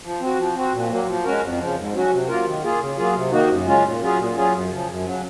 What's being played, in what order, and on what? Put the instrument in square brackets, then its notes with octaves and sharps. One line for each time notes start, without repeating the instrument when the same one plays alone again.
[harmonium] F3
C4 F#4
F3
C4 F#4
A#2
F#3 A#3
F3
G#3 C#4 F#4 A#4
F2
C#3 F3
G#2
F#3 C#4 F#4
C3
F#3 A#3 F4 A#4
D#3
A#3 F4 G#4
C#3
F#3 A#3 F4 G#4
C3
D#3 A#3 D#4 F#4
F#2
C#3 G#3 C#4 F4
A#2
F#3 C#4 F4 G#4
A#2
F#3 C#4 F4 G#4
F#2
C#3 F3
F#2
C#3 F#3